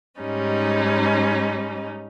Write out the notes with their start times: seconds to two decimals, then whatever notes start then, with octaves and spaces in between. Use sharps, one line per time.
0.20 G#2 G3 C#4 D#4